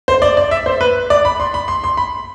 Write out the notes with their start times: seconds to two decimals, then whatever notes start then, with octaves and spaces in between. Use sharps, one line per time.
0.08 C5
0.22 D5
0.37 D5
0.51 E5
0.66 C5
0.81 B4
1.10 D5
1.25 B5
1.40 C6
1.54 B5
1.68 C6
1.84 C6
1.97 B5